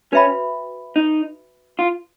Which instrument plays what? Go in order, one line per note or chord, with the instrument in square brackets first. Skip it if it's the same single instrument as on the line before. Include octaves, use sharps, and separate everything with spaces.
[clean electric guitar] C#4 [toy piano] F#4 B4 E5 G5 B5
[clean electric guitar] D#4
F4